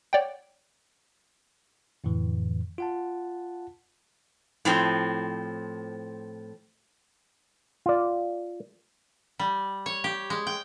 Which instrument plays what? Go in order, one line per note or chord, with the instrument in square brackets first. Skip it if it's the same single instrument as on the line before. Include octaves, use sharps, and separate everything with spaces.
[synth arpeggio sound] C#5 D5 F#5 G5
[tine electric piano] F2 A2 D3 E3
F4 F#5 A5
[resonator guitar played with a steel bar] A2 F3 C4
[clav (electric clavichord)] F4 D5
[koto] G3
C#5
G4
G#3
G5